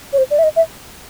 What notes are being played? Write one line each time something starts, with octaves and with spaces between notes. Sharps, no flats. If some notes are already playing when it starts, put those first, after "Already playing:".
C#5
C5
D5
E5
D#5
E5